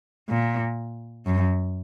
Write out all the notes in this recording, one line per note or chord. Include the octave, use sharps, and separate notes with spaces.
A#2
F#2